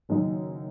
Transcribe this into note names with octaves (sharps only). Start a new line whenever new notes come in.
F#1 F#2 D#3 A#3 D#4